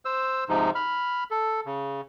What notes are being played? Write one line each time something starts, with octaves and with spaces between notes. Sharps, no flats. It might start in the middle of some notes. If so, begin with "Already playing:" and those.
C5 E6
G#2 C3 F3 D#4
B5 F6
A4
C#3